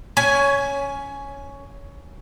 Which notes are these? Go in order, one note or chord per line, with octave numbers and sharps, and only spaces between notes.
C#4 G#5